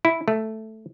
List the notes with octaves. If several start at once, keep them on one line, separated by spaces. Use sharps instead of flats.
E4
A3